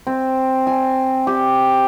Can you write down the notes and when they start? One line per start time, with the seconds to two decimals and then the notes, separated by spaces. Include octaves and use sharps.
0.07 C4
0.67 G#5
1.27 G4